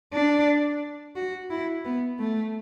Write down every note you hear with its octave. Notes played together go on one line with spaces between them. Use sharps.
D4
F#4
E4
B3
A3